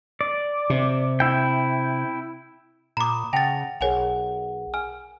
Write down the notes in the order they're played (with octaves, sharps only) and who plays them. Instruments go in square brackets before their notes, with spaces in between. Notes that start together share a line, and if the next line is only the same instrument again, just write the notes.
[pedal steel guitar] D5
[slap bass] C3
[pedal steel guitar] E4 G5
[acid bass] A#2 [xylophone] A#5 D6 [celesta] B5 D#6
[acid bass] C#3 [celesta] F#5 A#6 F7 [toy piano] G5 [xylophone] A5 A6
[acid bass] B1 [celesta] G#4 A#4 F#5 [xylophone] C#5 G#5 F7
[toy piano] G#5 [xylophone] F6